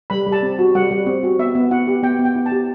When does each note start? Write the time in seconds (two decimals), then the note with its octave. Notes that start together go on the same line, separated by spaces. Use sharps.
0.10 G3 B5
0.27 G3
0.32 A5
0.43 C4
0.59 F#4
0.75 G3 F#5
0.91 G3
1.06 C4
1.23 F#4
1.39 B3 E5
1.55 B3
1.71 E4 F#5
1.87 G4
2.03 B3 G5
2.19 B3
2.25 G5
2.36 E4
2.46 A5
2.52 G4